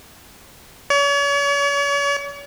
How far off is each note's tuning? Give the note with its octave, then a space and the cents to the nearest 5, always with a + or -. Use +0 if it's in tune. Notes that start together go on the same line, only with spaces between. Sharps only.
C#5 +40